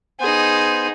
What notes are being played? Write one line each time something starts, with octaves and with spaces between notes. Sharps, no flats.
B3 D#4 G#4 C5